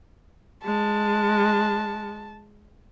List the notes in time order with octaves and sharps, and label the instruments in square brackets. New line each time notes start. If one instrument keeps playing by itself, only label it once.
[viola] G#3 [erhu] A5